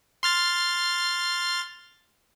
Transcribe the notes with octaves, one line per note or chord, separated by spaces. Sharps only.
C6 F6 A6